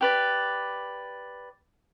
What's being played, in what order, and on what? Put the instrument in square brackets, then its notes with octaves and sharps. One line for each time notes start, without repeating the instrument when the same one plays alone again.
[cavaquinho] G4 B4 D5